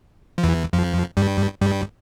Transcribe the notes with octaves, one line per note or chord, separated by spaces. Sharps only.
F3
E2 E3
F2 F3
G2 G3
G2 G3